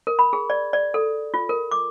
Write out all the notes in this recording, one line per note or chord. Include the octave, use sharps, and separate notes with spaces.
A#4
B5
G#4
D5
D5
A4
F4
A#4
D6